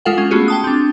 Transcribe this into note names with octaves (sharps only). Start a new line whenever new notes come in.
G#3 F4 A4 F5 F#5
C#4
A3 B3 C#4 F4 F#4 G#4
G5 A5 D#6
C4 D4